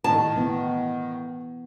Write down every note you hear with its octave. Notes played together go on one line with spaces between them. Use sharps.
A2 D#3 A5
E3 B3